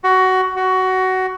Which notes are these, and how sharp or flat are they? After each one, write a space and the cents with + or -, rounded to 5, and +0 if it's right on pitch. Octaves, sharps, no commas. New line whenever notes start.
F#4 +15
F#4 +15